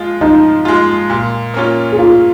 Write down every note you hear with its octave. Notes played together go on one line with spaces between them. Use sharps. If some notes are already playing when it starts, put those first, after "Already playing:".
Already playing: F3 G#3 F4
F3 D#4
G#3 F4
A#2
A#3 C#4 F4
G#4
A#2 F4